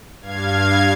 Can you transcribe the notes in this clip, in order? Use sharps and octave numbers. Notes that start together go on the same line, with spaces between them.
G2 F5 G#6